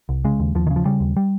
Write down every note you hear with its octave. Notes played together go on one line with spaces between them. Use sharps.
C2
C#3 G#3
D#2
D#2 F3
D#3
C#3
F3
C#3 G3
D#2
G3